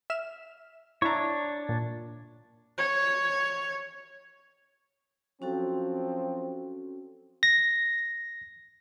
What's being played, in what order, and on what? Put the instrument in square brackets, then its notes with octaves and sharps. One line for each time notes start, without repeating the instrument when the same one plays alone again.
[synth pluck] E5 F6 E7
[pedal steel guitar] D4 C#5 [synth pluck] E4 E5 A#5
[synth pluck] A#2
[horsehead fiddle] C#5
[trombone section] F3 F#3 C4 [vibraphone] C#4 F#4 A4
[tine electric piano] A#6